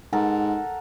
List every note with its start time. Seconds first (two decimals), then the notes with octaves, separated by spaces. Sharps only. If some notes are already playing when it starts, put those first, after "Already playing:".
0.13 G#2 A4 A#4 F#5